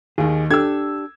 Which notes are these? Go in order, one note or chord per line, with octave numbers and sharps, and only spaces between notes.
D#2 D#3 G#4
D4 G4 A4 E6 G#6